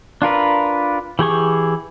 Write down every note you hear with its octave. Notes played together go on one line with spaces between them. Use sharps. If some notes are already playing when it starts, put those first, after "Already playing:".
D4 F4 A#4 B4
E3 G4 G#4 C#6